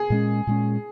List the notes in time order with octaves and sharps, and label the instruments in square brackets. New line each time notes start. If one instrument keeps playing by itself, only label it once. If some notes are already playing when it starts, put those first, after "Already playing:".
Already playing: [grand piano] G#4
[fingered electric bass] A#2 G#3 C#4
A#2 G#3 C#4